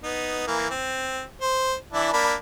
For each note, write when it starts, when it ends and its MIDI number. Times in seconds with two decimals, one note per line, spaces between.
0.04 0.46 59
0.04 0.46 63
0.47 0.69 52
0.47 0.69 58
0.70 1.23 60
1.42 1.75 72
1.93 2.09 52
1.93 2.09 62
1.93 2.09 64
2.13 2.34 58
2.13 2.34 62
2.13 2.34 83